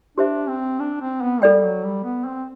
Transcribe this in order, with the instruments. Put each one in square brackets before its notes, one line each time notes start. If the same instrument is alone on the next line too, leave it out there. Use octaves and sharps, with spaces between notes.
[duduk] D4 [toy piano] G4 C5 E5
[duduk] C4
D4
C4
B3
[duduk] G3 [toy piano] A4 D5 G5
[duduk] F#3
G3
B3
C4